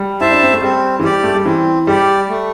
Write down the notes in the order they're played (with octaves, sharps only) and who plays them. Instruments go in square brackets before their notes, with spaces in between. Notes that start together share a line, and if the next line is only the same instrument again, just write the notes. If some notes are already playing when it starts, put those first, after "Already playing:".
Already playing: [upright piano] G3
[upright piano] E4 [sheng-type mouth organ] C5 E5 A5
[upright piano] D4
C4
A3
[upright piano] G3 [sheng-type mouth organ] C4
[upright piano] E3
[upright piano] G3 [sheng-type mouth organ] G4 D5
[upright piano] A3
G3
[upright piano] E3 [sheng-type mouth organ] C4
[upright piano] G3 [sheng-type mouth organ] G4 D5
[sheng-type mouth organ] A3